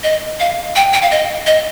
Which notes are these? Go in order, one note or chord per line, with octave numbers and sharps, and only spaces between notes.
D#5
F5
G5
G5
F5
D#5
D#5